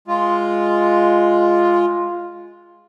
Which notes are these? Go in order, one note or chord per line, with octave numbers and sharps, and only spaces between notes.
G#3 F4